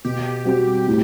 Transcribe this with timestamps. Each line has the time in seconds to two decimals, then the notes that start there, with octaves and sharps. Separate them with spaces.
0.05 B2 G4
0.45 G3 C4 F#4
0.88 A2